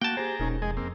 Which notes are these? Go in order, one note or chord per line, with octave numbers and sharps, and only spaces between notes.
A#3 F#4 G5 A5
G4 G#4 C5 A#5
E1 C#4 D#4 A#4
F2 G#3 G#4 D#5
A#3 C4